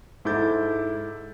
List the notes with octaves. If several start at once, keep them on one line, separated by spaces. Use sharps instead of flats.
G#2 E4 A4 D6 G6 A6